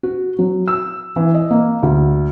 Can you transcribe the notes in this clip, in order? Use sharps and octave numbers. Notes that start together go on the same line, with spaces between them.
F#4
F#3
E6
E3
D#5
A#3
D2